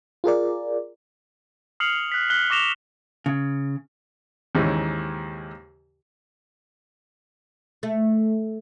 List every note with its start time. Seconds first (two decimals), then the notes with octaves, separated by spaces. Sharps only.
0.24 F4 G#4 A#4 D5
1.80 D#6 F6 C7 C#7 F7 F#7
2.12 F#6 B6
2.30 F#6 B6 G7
2.50 C#6 D6 A#6 E7 F7 G7
3.26 C#3
4.55 D#2 G#2 C#3 E3 C#4
7.83 A3